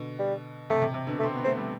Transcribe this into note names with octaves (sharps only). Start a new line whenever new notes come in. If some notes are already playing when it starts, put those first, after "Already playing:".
Already playing: B2 D3
G3
C3 A3
C3
C3
B2 D3
A3
C4
B3
A3 C4
G3